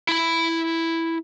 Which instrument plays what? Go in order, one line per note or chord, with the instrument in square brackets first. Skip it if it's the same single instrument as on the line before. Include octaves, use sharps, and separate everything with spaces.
[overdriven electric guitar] E4 B5